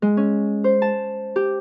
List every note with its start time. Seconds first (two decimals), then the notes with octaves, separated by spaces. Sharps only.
0.02 G#3
0.17 C#4
0.64 C5
0.82 A5
1.36 G4